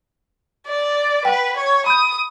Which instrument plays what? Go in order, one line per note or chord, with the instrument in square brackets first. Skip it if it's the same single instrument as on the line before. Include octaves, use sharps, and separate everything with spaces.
[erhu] D5
[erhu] B4 [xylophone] F#5 G5
[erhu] C#5
[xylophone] B5 G6 [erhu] D#6